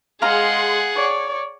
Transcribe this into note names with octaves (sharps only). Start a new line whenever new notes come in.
G#3 G#4 F5 F#5 A#5 C6
C#5 D5